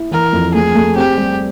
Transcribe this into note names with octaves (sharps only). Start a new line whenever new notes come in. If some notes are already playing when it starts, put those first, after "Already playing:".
Already playing: E4
E3 A#4
F2
A3 G#4
A3
C4 G4
G3